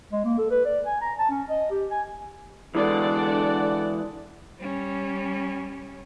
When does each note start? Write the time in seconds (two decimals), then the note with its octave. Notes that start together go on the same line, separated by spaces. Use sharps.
0.12 G#3
0.25 A#3
0.38 A4
0.51 B4
0.65 D5
0.86 G#5
1.01 A#5
1.19 A5
1.30 C#4
1.49 D#5
1.71 G4
1.91 G#5
2.75 D3 E3 G#3 D4 D5 F#5
4.59 G3 C#4